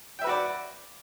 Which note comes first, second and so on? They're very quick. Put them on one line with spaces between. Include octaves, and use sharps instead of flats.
G5 E5 B4 F#4 D5